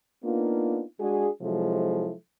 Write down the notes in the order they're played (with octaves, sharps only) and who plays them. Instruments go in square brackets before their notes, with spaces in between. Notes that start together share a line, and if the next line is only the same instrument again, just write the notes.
[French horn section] A#3 B3 D4 D#4 F4
G#3 D4 F#4 G#4
C3 F3 F#3 G#3 E4 A4